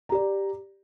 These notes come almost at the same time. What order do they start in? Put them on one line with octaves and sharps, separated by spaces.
A#5 G4 D5